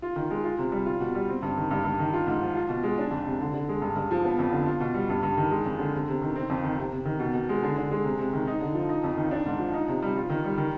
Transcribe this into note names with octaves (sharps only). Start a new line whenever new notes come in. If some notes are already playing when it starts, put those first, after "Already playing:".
F4
D#3
G#3
F4
C3
G3
F4
B2
G3
C4
G2
D#3
G2
G2
D#3
F4
G#2
F3
F4
B2
G#3
D4
F2
C3
D3
D3
G#3
G2
G2
F3
B3
F2
D3
F4
B2
G3
G2
G2
D#3
G#3
F2
D3
C3
C3
D#3
C4
F2
D#3
C3
C3
D#3
B2
B2
G#3
D3
D3
G#3
C3
C3
D#3
D#4
D3
F3
D#4
F2
D#3
D4
G#2
F3
D#4
C3
G3
F4
D#3
G3
D#3